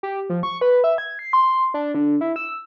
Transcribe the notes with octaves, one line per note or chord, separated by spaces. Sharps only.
G4
F3
C#6
B4
E5
G#6
C7
C6
D4
D3
E4
E6